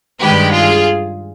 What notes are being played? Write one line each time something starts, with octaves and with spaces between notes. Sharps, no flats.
G2 D#3 G#3 G4 B4
F4 G#4